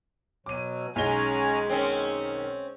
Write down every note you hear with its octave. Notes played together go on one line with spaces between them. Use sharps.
B2 F#3 D6 D#7
B1 G#3 C#4 D#4 G#5 A#5 G7
D#3 C4 C#4